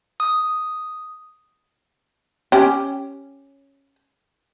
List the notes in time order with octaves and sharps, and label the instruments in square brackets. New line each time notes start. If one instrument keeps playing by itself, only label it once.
[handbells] D#6
[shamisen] C#4 G4